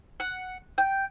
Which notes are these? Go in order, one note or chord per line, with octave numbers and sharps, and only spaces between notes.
F#5
G5